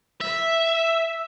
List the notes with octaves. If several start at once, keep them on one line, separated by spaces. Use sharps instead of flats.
E5